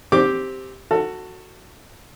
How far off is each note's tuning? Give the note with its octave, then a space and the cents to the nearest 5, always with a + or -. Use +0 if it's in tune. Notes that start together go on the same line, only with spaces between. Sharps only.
C4 +0 G4 +0 D6 +0
F#4 +0 A4 +20